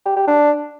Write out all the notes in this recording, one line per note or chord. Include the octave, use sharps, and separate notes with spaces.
G4
G4
D4